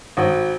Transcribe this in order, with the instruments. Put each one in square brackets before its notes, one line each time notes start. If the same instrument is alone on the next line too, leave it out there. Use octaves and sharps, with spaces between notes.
[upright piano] G#1